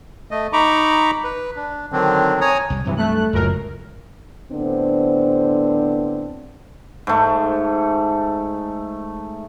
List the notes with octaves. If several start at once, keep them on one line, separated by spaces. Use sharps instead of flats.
A3 D#5
D#4 A#5 B5 C#6 D6
B4
D4
D3 D#3 F#3 C4 D4
C#5 G#5 A#5 D#6
C2 G3
G2 C3 E3 F#3
A3 F#6
F#1 C#2 F#2 A2 A#4
A2 D3 B3 C4 D4 C5
G#2 A3